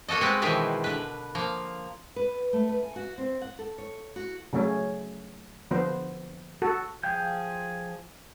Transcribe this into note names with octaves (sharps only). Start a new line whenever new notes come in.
A#3 F#4 A4 D#5
G#3 C4 B4
B2 D#3 E3 B3 C4 B4
D3 B4
F3 A#3
B4
A3
B4
G#5
F#4
C4
F#5
A4
C#5
F#4
C#3 F#3 A3 C#4 G#4
D3 F3 B3 F4 C5
F#4 A4
F3 G#4 F5 G5 G6